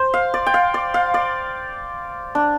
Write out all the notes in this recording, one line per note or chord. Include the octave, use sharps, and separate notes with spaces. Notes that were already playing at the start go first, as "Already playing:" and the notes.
Already playing: C5
F5
D5
G5
F5
D5
F5
D5
D4